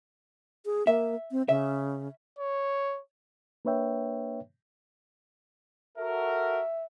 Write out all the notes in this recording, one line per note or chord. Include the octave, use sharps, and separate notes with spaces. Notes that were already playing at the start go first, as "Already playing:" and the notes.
G#4
A#3 E5
C4
C#3 E5
C#5
A#3 D4 B4 C#5 E5 G5
F#4 A4 A#4 E5